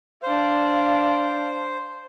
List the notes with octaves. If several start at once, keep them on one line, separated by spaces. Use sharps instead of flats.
D4 C5 F5